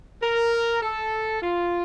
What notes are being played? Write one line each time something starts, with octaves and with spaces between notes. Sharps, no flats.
A#4
A4
F4